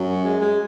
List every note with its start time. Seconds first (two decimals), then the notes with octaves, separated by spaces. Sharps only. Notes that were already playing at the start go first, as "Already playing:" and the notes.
Already playing: F#2
0.09 F#3
0.25 G#3
0.40 G#3